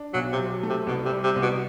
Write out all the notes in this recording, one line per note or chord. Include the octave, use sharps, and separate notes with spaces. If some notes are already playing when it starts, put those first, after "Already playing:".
Already playing: D4
B1 F#3
C3
F#3
A3
C3
C2 B2
C3
G3
C3
C2
B2